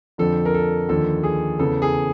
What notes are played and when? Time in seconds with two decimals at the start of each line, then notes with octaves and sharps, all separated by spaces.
0.18 F2 D3 F3 A4
0.45 A#4
0.54 A4
0.89 D#2 D3 F3 A4
1.23 G#4
1.59 E2 C#3 E3 A4
1.82 G#4